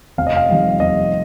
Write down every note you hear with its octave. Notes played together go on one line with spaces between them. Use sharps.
F1 F5
D#5
F5
F2 D#3 G3
F1 D#5